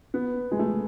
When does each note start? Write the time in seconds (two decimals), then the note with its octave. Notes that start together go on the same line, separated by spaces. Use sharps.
0.14 B3
0.51 G#3
0.59 A3